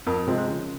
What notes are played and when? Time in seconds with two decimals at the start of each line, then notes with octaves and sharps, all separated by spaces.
0.06 F2 A#4
0.17 A#4
0.27 C3 F3 G#3 C4
0.38 C5
0.48 C#3